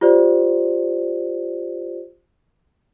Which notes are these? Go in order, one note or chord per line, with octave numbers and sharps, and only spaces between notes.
F4 G4 C5 D5